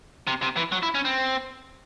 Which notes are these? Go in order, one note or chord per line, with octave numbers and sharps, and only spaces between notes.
C3
C3
E3
F#3
E4
C#4
C4